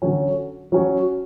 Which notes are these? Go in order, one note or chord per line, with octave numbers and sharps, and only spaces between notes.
D3 F#3 C#4 F#4
F#3 C#4 F#4